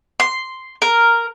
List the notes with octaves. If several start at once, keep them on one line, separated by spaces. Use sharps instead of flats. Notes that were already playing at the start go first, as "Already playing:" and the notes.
C6
A#4